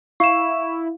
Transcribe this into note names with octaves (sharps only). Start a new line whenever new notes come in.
E4 F5 C#6 E7